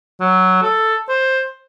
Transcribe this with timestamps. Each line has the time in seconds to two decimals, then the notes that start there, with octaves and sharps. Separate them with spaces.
0.21 F#3
0.63 A4
1.09 C5